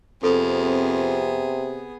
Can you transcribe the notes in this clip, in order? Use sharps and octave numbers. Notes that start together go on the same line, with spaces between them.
F2 C3 B3 G#4 A4